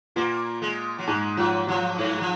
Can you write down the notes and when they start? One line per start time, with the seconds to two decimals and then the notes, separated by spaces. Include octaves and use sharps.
0.16 A#2 A#3
0.62 G#3
0.98 F#3
1.07 G#2 G#3
1.37 F3 F#3
1.67 F3 F#3
1.98 G#2
2.21 F3